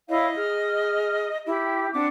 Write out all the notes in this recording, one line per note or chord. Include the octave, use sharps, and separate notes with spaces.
E4 C#5 D#5 F5
G#4 F6
F6
E4 G4
G5
C4 D4 F#5 D6